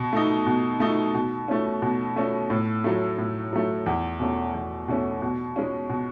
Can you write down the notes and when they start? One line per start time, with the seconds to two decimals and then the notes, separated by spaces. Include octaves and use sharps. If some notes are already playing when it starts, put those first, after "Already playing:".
Already playing: B2
0.13 A3 D#4
0.47 B2
0.80 A3 D#4
1.15 B2
1.48 A3 C#4
1.82 B2
2.16 A3 C#4
2.50 A2
2.84 F#3 A3
3.18 A2
3.53 F#3 A3
3.86 E2
4.20 B2 A3 C#4
4.54 E2
4.88 B2 A3 C#4
5.22 B2
5.56 G#3 C#4
5.90 B2